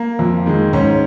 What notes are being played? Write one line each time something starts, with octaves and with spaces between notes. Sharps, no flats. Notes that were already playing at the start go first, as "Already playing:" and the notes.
Already playing: A#3
F2
D#3 G#3
G#2 C#4